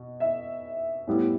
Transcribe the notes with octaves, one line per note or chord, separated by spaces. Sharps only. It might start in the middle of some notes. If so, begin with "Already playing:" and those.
Already playing: B2
E5
A2 G3 B3 E4